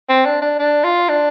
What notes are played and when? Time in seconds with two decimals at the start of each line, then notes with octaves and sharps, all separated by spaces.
0.09 C4
0.26 D4
0.42 D4
0.59 D4
0.84 F4
1.09 D4